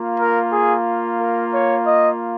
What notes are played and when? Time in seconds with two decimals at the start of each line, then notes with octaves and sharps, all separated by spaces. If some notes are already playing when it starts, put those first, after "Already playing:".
Already playing: A#3 F4
0.20 A#4
0.53 G#4
1.20 A#4
1.53 C#5
1.87 D#5